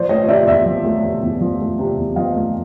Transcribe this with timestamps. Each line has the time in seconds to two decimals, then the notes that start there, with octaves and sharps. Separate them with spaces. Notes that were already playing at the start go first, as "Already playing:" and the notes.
Already playing: F3 C5 D5
0.09 A3 C#5 D#5
0.28 C3 D5 E5
0.47 E2 D5 E5
0.66 F3
0.84 A3
1.04 C3
1.23 E2
1.41 F3
1.60 A3
1.79 C3
1.98 E2
2.16 F3 D#5 F5
2.35 A3